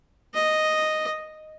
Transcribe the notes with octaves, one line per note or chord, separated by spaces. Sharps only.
D#5